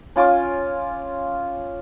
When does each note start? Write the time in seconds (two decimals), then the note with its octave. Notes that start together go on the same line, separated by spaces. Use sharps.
0.16 C#4 F4 D6